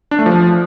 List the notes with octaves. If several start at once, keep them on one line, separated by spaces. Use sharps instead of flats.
D4
A3
F3